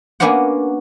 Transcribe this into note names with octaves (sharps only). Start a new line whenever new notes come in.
A#3 B3 C#4 D4 F#4 F#5